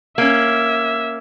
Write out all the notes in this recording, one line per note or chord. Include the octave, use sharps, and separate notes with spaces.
A#3 C#4 E5